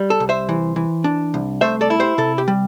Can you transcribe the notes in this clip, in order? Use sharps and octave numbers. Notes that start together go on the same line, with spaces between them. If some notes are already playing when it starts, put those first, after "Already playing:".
Already playing: G3
A4
C2
C5 E5
E3
E3
D4
C2
A3 C5 E5
A4 D5
E4
G4 C5
C3 A4
G4
G3